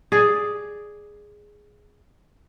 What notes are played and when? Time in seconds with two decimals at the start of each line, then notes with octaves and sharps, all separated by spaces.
0.12 G#4 D5